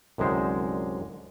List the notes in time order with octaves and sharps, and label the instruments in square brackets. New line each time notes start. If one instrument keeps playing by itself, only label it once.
[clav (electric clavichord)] C2 F#2 D3 G#3 C5